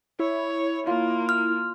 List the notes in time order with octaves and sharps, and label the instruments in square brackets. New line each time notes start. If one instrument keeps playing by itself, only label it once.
[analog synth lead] E4 [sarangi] C#5
[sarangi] A#3 [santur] F4
[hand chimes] F6